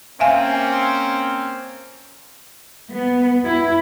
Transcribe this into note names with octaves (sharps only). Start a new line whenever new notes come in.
A#3 C4 C#4 E5 F5 G#5
B3
E4